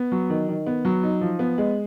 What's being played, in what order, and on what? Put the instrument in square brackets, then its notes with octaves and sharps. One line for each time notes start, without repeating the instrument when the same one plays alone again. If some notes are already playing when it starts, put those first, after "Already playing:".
Already playing: [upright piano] B3
F#3
D#3
D#3
B3
F#3
D#4
F3
B3
G#3